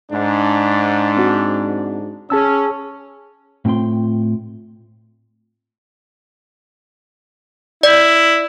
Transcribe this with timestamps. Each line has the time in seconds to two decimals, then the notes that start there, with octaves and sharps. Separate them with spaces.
0.11 G#2 D4
1.17 C4 F#4
2.30 C#4 G#4 A5 E6
3.65 A2 C4 F4 G5 C6
7.83 E4 D5